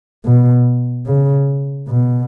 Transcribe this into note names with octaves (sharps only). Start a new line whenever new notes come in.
B2
C#3
B2